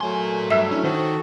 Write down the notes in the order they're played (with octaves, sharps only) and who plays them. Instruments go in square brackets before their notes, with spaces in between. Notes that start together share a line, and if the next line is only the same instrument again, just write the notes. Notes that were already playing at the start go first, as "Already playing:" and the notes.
[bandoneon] F#3 A3 [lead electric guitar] A#4 C6 [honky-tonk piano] G#5
[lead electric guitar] G2 [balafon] E5 [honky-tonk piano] E6 B6 E7
[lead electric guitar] C#4 [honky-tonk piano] D4 E4
[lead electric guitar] D#3 [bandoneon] F#4 A4 [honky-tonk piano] C5